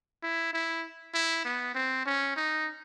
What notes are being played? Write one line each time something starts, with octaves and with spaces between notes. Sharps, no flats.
E4
E4
E4
B3
C4
C#4
D#4